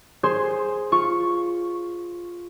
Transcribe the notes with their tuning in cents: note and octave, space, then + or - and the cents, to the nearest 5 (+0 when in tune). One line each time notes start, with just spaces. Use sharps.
G#4 +0 C5 +10 C6 +0
F4 +0 C#6 +0